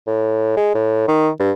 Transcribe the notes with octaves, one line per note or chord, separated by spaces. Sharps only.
A2
G#3
A2
D#3
G2